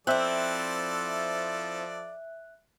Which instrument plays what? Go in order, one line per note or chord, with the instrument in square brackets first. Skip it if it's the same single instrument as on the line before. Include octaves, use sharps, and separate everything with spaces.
[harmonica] F3 A4 D5 [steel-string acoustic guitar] C4 E4 [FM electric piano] E5 F#6